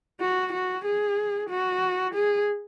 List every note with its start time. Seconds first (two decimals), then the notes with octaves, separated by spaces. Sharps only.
0.20 F#4
0.52 F#4
0.85 G#4
1.49 F#4
2.14 G#4